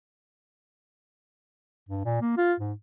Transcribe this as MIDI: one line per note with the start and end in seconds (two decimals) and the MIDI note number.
1.89 2.03 43
2.05 2.21 46
2.21 2.37 58
2.37 2.54 65
2.59 2.73 44